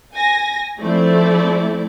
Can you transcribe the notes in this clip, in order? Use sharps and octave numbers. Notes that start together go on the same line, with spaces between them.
G#5 A#6
F3 A3 C4 E4 D5